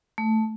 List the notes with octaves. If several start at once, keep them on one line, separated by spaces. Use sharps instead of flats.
A3